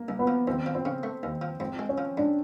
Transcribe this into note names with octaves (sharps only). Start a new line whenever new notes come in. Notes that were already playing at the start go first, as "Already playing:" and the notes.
Already playing: A#3
C2
B3
F3
D#2 C4
F3
C4
C#3
A3
D#2
F3
G#2 C4
G#3
C#4
F3
G#2 D4